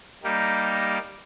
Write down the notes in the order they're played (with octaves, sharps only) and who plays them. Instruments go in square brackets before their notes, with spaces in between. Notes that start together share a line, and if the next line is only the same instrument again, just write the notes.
[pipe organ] G3 A#3 D#4 G4